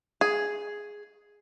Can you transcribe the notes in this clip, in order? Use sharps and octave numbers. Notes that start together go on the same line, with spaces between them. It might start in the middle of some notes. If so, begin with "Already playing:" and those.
G#4